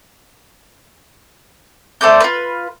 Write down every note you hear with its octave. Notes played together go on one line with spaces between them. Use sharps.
A3 C5 D5 G6
F4 B4